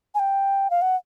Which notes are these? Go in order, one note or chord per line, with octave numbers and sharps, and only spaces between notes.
G#5
G5
F5
F#5